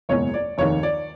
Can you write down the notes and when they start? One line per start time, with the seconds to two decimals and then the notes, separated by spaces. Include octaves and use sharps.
0.09 F#1 E2 B2 G#3 C#5
0.34 D5
0.58 F1 D#2 D#3 C#5
0.83 D5